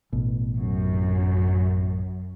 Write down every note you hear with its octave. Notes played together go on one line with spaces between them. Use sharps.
A1 B2
F#2